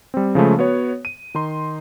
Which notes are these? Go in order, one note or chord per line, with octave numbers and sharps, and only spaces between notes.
G3 C4
C#3 F3 G#3 A3
B3 F#4 C#5
D#7
D#3 D#4 C6